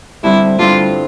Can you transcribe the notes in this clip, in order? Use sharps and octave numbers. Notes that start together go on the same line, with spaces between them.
G2 D3 G3 C4 E4
G2 D3 G3 C4 E4 F4